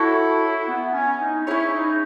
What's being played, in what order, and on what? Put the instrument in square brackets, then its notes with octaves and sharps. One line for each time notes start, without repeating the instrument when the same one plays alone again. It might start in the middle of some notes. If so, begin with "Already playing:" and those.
Already playing: [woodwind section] E4 [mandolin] F#4 A4 C#5
[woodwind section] B3
C#4
D#4
[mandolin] C#4 G#4 C#5 [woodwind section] E4
[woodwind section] D#4